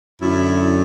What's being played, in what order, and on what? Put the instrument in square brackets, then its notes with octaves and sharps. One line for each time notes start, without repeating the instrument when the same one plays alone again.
[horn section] F#2 D3 F#3 E4